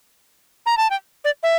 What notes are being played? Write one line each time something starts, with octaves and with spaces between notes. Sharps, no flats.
A#5
A5
G5
D5
E5